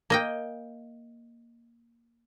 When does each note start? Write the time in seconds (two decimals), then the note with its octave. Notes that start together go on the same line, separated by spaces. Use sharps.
0.10 A#3 D#5 G5